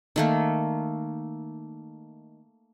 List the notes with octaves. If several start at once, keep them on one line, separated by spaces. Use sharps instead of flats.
D#3 A3 A#3